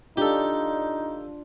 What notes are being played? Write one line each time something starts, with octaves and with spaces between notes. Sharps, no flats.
D4 D#4 F4 G4 A4